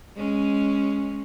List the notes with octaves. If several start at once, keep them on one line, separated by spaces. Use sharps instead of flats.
G#3 C#4